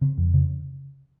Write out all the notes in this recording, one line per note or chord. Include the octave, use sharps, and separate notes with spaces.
C#3 C4
F2
C#3